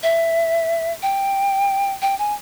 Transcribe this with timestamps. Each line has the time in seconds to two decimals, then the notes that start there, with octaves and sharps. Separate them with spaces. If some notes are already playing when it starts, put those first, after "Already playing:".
0.03 E5
1.02 G5
2.02 G5
2.19 G#5